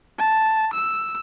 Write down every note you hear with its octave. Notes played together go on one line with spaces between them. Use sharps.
A5
E6